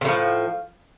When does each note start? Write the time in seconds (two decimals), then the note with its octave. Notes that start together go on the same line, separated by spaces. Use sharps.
0.01 C3
0.05 A2
0.08 F3